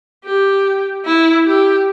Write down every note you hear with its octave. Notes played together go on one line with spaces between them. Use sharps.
G4
E4
G4